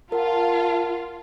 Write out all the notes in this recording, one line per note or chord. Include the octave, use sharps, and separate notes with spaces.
F4 A#4 F#5 A5